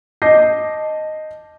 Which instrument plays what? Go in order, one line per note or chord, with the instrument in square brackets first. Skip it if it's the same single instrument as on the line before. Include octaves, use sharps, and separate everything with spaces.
[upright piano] D#5 A5 D6 G6 A#6 C7